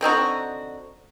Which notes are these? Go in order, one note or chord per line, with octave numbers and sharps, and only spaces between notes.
D3 C4 D#4 F#4